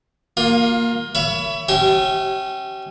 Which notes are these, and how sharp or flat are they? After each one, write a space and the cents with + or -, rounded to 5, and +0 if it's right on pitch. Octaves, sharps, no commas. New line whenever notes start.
A#3 +0 F4 +25
C#5 +30 E5 +30 B5 +5
C#4 -25 G4 -35 E5 -20